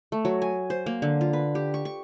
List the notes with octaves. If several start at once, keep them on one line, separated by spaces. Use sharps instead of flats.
A3
F#3
G#5
C5
A#3
D3
F4
B4
G4
C#6
C#6